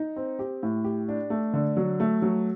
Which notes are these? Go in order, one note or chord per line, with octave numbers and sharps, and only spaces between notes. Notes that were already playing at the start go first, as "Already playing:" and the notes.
Already playing: D#4
C4
G4
A2
G4
D4
A3
D3
F#3
A3
F#3